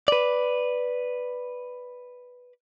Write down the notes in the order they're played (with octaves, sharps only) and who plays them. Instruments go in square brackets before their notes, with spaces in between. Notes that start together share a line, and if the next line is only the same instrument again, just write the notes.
[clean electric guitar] B4 D5